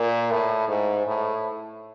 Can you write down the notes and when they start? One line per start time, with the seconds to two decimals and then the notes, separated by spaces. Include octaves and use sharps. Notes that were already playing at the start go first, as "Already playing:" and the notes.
Already playing: A#2
0.31 A2
0.68 G#2
1.07 A2